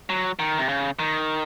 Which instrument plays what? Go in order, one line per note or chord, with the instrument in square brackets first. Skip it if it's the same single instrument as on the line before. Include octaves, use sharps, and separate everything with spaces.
[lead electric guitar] F#3
D#3
C3
C#3
D#3